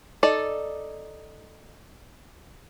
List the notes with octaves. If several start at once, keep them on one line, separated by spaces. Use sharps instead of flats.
D#4 A4 D5